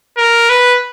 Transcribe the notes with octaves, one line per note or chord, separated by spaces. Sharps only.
A#4
B4